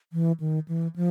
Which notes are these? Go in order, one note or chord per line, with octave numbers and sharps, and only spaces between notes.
E3
D#3
E3
F3